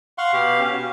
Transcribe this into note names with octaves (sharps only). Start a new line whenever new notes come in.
F5 F#5 C6 C#6
B2 G4 F5
C#4
F#4